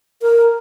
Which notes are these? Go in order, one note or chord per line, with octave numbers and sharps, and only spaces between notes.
A#4